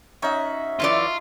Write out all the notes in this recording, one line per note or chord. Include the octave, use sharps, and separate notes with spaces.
C#4 D#4 F#4 E5
F#2 E3 F4 D5